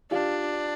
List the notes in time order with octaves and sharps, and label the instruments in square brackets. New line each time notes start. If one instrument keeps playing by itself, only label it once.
[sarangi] D4 [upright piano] F4 G4